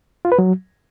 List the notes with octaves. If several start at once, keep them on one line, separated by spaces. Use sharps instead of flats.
F4
B4
F#3